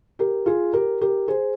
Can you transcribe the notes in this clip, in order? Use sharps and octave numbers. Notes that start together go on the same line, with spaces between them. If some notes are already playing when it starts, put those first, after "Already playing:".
G4 A#4
F4 G#4
G4 A#4
G4 A#4
G#4 C5